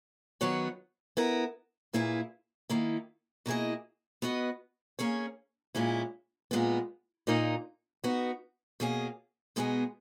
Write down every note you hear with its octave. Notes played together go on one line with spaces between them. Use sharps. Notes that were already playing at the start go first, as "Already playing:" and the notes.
D#3 F#3 B3 F#4 C#5
B3 E4 A#4
A#2 A#3 E4 G#4 B4
D#3 A#3 E4
B2 A#3 E4 G#4 D#5
B3 F#4 B4 D#5
A#3 C#4 G#4 C#5
A#2 G#3 C#4 E4
A#2 G#3 B3
A#2 A#3 D#4 A#4 D#5
B3 D#4 F#4
B2 A#3 C#4 G#4
B2 G#3 B3 D#4 G#4